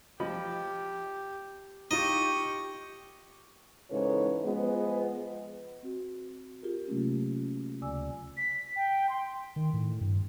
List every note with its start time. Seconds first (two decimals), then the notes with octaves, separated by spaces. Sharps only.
0.20 F3 G4 D#5 B5
1.91 D#4 F4 G4 D#5 C#6
3.91 G#2 C#3 E3 A4 B4 C#5
4.44 F3 G#3 B3 G#4 B4 D#5
5.83 C4 F#4
6.62 F4 G4 G#4 A#4
6.87 C3 F#3 A3 A#3 C#4
7.81 D2 C#3 D5 G#5 D6 E6
8.37 B6
8.76 G5
9.09 C6
9.56 D#3
9.73 A2
10.01 G2